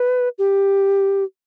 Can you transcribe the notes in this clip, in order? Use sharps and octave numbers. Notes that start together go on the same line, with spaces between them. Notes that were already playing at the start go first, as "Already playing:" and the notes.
Already playing: B4
G4